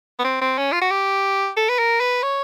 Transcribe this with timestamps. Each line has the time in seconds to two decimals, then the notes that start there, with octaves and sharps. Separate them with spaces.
0.19 B3
0.25 C4
0.41 C4
0.58 C#4
0.72 F4
0.81 F#4
0.91 G4
1.57 A4
1.69 B4
1.79 A#4
2.00 B4
2.23 C#5